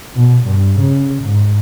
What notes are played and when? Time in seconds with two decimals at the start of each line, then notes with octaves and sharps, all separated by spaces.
0.15 B2
0.46 G2
0.80 C#3
1.23 G#2